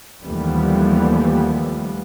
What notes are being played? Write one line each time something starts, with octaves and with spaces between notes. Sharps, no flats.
D#2 E3 F3 G3 A3 B3